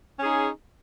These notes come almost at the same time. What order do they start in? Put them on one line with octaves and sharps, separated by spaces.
C#4 G#4 D#4